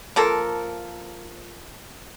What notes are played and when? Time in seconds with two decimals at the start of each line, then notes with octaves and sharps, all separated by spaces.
0.16 F3 A#3 A4 A#4